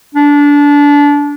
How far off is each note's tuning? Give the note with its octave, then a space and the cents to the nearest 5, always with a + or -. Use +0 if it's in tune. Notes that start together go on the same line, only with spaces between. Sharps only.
D4 -25